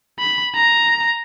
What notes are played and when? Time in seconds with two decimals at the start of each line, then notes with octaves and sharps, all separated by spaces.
0.19 B5
0.55 A#5